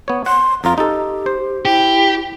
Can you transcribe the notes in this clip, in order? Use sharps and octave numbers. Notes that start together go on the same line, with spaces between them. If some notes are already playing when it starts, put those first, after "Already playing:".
B3 C#5
F#5 C6
F2 F4 A#5
D#4 G4 A4
C5
E4 G4